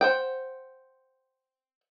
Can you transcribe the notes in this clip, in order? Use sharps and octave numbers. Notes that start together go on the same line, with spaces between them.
C5 F#5 G5